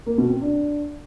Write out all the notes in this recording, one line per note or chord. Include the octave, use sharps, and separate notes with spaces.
A#3
B2
C4
D4